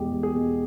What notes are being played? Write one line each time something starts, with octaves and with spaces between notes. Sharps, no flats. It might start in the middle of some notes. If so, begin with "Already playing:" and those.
Already playing: E1 E2 B2 G#3 G4 G#4
E1
G#4
B2